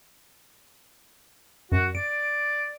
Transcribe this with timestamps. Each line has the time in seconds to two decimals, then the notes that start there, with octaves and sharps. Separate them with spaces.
1.72 F#2 F#4
1.95 D5 D7